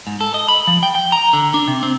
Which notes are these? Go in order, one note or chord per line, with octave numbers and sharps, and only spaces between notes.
G#2
A4
D#5
B5
F3
G5
G5
A#5
D3
D4
C3
C4